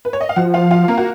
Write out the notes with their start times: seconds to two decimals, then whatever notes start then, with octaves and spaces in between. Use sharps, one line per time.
0.05 B4
0.13 C#5
0.21 D#5
0.29 F5
0.36 F3 F#4 F#5
0.54 F4 F5
0.71 F4 F5
0.88 A#3 A#4
0.98 F#4